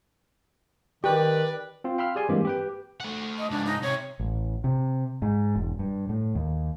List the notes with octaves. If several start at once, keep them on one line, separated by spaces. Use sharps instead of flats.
D#3 G4 B4 D5
C4 F4
F5 G5 B5 C6 E6 F6
G4 G#4 D5 G#5 C6
G2 E3 G#3 A#3 C4 G4
G4 B4 G5
A3 F#5
D#5
C#2 G#2 D4
D#4
C3 C#5
A1
C3
G#2
E1
G2
A2
D#2